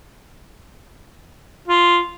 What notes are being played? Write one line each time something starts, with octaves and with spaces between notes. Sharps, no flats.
F4